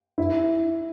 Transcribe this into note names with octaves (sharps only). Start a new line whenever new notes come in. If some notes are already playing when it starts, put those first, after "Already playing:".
E4